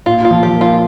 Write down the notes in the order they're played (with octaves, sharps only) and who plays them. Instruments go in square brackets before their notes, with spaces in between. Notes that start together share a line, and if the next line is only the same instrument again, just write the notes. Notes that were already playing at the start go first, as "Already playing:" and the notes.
[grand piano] A#2 [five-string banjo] F4
[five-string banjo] F4
[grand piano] F3
[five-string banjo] G4
[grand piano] A#3
[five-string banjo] F4